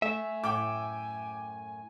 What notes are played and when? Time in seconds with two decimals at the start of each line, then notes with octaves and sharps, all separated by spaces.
0.02 A3 E5 G#5
0.44 F#2 A2 G5 D6